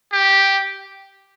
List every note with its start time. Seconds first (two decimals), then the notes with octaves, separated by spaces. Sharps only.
0.13 G4